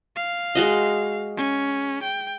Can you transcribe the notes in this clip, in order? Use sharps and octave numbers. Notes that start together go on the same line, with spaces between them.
F5
G#3 F#4 D#5
C#4
G5